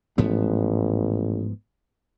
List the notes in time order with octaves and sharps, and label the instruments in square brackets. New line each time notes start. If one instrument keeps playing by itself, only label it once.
[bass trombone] A1 [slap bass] G#2 F3 B3